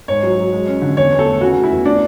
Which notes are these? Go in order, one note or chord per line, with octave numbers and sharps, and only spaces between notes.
G#2 C#5
F#3
F#3
G#3
C#4
D3
E2 C#5
E2
A4
A3
C#3 F#4
A3
E4
E2
A3 D4